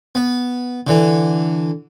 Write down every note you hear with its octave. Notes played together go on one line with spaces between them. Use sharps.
B3
D3 E3